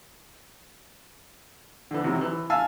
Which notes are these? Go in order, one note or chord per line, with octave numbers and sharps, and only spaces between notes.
D3 E3
C3 D#3 F#3
E3
E5 F5 G#5 A5 E6 F6